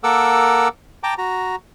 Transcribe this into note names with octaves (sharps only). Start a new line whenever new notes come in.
A#3 A4 A#4 F#5 D6 E6
G5 A5 A#5 D6
F#4 A#5